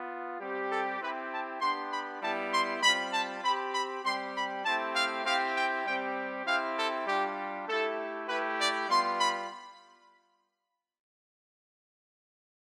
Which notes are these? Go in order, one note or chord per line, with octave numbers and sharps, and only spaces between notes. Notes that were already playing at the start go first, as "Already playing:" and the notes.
Already playing: B3 F4
G3 C4 G4
A4
C4 E4 G4 B4
A5
B3 D4 G4 C6
B5
G3 B3 E4 G4 A5
C6
G3 C4 F4 B5
A5
C4 G4 B5
B5
G3 C4 G4 C6
B5
A3 C4 E4 G4 A5
F5
C4 E4 G4 F5
G5
G3 C4 G4 G5
C4 E4 G4 F5
A4
G3 D4 F4 G4
A3 E4 G4 A4
A3 E4 G4 B4
D5
G3 B3 F4 C6
B5